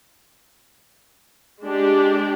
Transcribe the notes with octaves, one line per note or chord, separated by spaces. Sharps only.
G#3 D4 G4